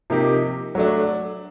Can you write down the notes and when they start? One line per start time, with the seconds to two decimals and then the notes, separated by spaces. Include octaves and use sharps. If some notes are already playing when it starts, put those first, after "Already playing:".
0.10 C3 F3 A#3 D#4 G4
0.75 F#3 A3 D4